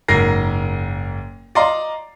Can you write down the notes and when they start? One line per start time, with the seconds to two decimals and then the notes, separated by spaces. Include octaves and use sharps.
0.08 F#1 G#2 A#4 A#6 C7
1.55 D5 D#5 F5 A#5 C6